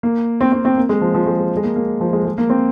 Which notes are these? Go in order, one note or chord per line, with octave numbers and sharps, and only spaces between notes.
A#3
C4
C4
C4
A#3
G#3
F3
F3
G#3
G#3
G#3
A#3
A#3
F3
G#3
G#3
A#3
C4